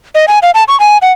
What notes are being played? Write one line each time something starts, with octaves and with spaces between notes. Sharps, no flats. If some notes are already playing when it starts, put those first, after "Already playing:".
D#5
G#5
F5
A5
C#6
G#5
F#5